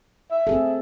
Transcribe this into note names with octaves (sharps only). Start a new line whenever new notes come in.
E5
C4 G#4 A4